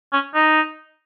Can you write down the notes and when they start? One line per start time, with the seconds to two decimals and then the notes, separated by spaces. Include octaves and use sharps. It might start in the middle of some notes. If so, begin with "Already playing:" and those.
0.13 C#4
0.35 D#4